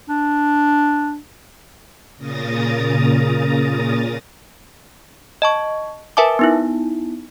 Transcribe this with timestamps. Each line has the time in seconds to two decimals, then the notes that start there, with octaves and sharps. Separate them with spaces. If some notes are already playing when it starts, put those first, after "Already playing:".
0.09 D4
2.18 A#2 C#3 A#4 A#5 D#6 A6
5.42 D#5 A5 C#6
6.17 A#4 B4 E5 G#5 A5 D6
6.39 B3 D#4 E4